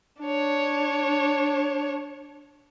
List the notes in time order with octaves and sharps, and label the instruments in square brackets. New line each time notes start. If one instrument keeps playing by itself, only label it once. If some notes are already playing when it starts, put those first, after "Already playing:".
[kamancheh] D4 C#5